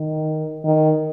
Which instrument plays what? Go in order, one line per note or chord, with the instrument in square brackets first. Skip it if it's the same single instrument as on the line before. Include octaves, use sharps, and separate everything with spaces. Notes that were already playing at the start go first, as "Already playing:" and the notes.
Already playing: [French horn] D#3
D#3